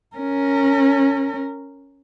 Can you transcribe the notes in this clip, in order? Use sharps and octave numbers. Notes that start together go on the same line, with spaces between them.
C#4 A#4